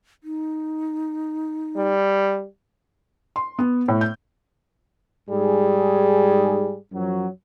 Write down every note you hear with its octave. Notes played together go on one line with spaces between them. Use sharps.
D#4
G3
C6
B3
A2
G6
G#2 G3 G#4
F#2 F3 F#3